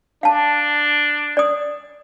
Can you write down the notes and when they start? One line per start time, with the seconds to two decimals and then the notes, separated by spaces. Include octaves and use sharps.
0.23 D4 F5 A5
1.37 D5 D#6